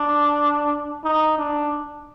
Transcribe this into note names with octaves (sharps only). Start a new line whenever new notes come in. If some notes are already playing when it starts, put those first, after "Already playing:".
Already playing: D4
D#4
D4